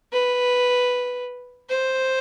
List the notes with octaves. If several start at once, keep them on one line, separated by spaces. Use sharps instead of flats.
B4
C5